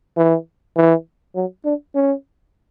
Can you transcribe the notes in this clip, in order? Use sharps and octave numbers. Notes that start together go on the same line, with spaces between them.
E3
E3
F#3
D4
C#4